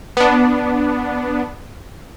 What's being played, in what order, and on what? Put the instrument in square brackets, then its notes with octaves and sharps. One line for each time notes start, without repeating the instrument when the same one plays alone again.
[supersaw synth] B3 D4